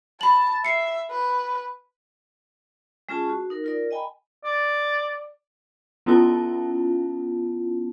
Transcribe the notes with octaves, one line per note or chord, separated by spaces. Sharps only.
A5 B5 F#7
E5 C7 C#7
B4
G#3 C#4 F4 G#4 A5 C#6
F#4
D#4 A#4
F4 A#4 D5
D#5 G5 G#5 A#5 B5
D5
B3 C#4 E4 F4 A5